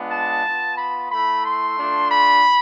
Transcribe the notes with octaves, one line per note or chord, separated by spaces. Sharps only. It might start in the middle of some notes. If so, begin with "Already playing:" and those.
Already playing: G#3 B3 D4 F4
A5
B3 F4
B5
A3 E4 B5
C6
A3 D4 F4
B5